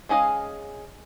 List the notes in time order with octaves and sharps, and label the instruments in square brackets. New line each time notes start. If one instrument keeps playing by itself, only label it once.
[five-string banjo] G#3 C#4 G#4 D#5 F5